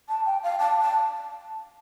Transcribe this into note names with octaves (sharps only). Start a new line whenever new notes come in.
A5
G5
F5
A5
A5